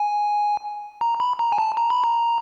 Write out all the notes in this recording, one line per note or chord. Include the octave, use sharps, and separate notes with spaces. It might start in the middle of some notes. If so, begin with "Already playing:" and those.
Already playing: G#5
A#5
B5
A#5
G#5
A5
A#5
B5
A#5